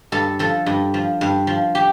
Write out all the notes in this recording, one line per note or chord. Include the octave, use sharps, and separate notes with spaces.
G2 A4
F3 A4
G2
F3
G2
F3
G4